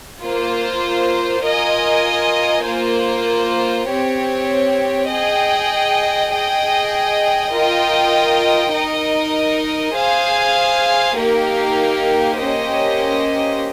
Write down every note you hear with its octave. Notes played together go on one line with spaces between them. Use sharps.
A#3 F4 C5
F4 A#4 D#5 G#5
A#3 F4 C5
C4 G4 C#5
G#4 D#5 G5
G#4 D#5 G5
F4 A#4 D#5 G5
D#4 A#4 D#5
G#4 C5 F5 G#5
A#3 D#4 G4 A#4 F5
A#3 C#4 G4 C5 D#5